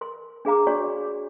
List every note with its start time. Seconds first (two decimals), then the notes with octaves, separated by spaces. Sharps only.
0.01 A#4 C6
0.45 D4 G#4 F5 A#5 D6
0.67 D4 F#4 C#5 D5 C#6